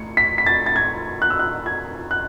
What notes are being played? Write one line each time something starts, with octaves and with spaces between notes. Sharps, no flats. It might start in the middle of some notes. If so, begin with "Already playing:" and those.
Already playing: A2 C#7
B6
B6
A6
A6
G#6
F#6
E6
F#6
G#6
F#6